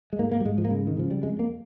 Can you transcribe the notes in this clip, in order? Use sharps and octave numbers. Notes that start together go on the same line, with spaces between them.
G#3
G#2 A#3
A#3
G3
G#2 G#3
F3
A#3
C#3 G#3
D#3
C#3 F3
G3
F2 G#3
A#3